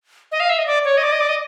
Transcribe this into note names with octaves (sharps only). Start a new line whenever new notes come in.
D#5
F5
E5
D#5
D5
C#5
D#5
D5
D#5
D5
D#5